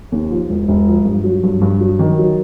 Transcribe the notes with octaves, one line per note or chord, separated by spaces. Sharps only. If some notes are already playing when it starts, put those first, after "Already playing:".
D#2
F3
E1
E1
F3
G2
F#3
G2
G2
F#3
D#3
F#3